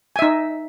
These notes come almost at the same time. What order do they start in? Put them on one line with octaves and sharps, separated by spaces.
G#5 E5 D#4